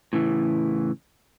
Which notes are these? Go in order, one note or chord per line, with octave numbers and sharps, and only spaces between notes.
A2 C#3 E3